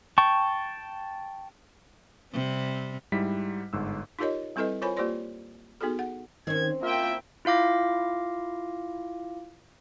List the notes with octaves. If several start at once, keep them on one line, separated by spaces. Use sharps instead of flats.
G5 A5 C#6
C3 G3 C4
G#2 G3 E4 B6
G1 G#2 E6
D#4 F4 G4 A#4 C#5 D#5
G3 C4 E4 A4 B4 D#5
F4 A#4 C5 C#5 G#5 B5
A#3 F4 G4 C5 D5 C6
B3 D#4 F#4 G#4 A4
F#5
D#3 C4 C#4 G#6
A#3 E4 F4 E5 G5
E4 F4 F5 D6 A#6